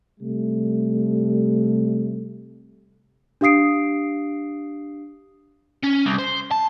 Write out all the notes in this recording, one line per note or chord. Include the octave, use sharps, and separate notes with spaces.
C3 G3 A3
D4 G4 F5 D#6 C7 D7
C#4
C2
C5
A5